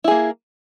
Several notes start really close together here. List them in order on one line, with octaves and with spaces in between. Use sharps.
E4 G#4 A#3